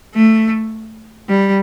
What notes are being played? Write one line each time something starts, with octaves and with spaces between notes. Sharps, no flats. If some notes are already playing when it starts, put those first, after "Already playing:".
A3
G3